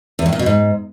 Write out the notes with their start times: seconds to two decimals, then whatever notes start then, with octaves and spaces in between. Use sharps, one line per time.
0.19 E2
0.26 A2
0.33 A#2
0.39 B2
0.46 G#2